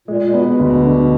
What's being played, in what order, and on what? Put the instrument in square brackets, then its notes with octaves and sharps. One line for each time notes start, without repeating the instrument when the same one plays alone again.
[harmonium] A#2 [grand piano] G#3
[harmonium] A#2
[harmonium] B2 [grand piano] B3
[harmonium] B2
[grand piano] D2 [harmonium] B2
[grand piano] D3